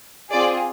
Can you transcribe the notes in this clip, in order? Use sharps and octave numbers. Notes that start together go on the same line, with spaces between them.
C4 F4 G#4 D5